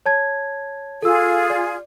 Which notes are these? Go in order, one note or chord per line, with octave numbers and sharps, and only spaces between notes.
C#5 A5 G#6
F4 G#4 A4 E6
D5